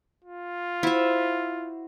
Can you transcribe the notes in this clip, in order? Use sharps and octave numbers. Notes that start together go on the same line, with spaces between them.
F4
E4 F#4 C5 E5 F5